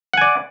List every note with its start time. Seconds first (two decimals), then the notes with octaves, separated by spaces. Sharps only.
0.14 F#5
0.17 G#5
0.21 D5